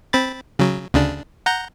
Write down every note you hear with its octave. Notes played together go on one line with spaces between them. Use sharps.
C4 B5 A6
C#3 F#3
D2 C#3 D4
F#5 A#5 G6